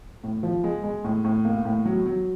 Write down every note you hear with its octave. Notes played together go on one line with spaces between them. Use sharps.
A2
F3
G#3
G#3
A2
A2
A#3
A2
F#3
F#3